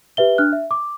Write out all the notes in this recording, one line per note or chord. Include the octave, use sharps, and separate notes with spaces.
G4 B4 E5 G7
D4 F6 F#6
E5
D6